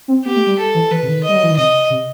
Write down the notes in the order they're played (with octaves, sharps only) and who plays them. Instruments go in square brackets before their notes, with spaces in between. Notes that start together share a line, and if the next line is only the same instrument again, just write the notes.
[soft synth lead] C4
[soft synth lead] B3 [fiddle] G4
[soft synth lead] A3
G3
[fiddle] A4
[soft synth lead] E3
[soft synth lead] E3 [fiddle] B4
[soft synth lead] C3
D#3
[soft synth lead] G3 [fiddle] D#5
[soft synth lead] F#3
E3
D#3
[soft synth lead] C3 [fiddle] D#5
[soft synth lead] C3